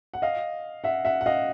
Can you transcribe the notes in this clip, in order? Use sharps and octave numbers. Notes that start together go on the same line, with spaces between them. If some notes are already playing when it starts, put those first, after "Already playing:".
F#5
D#5 F5
E5 F#5
E5 F#5
F#5
D#5 F5